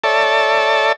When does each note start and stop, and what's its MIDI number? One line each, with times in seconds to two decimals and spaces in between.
0.04 0.92 69
0.04 0.92 73
0.04 0.92 74
0.04 0.92 76
0.04 0.92 81